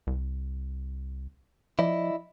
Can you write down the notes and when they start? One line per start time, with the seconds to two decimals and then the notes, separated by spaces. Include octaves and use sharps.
0.07 C2
1.79 F3 E4 D5 D#5